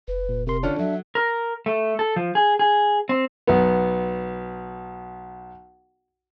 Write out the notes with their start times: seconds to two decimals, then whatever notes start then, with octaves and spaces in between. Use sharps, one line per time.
0.08 F1 B4
0.29 A#2
0.47 C3 A#4 C6
0.63 D3 C#4 D4 F4 C#5
0.79 F#3 E5
1.15 A#4
1.66 A3
1.99 A4
2.16 F3
2.35 G#4
2.59 G#4
3.09 C4
3.47 B1 B3